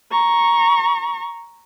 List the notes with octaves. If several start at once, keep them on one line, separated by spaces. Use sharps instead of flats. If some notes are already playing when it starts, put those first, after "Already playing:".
A#5 C#6